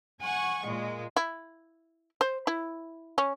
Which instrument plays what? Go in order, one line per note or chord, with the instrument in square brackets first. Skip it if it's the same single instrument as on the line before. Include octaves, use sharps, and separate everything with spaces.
[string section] F#5 G#5 C#6
A#2 G#3
[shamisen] E4
C5
E4
C#4